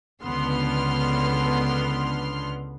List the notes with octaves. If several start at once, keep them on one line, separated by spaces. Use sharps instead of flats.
C#2 D3 B3 C6 F6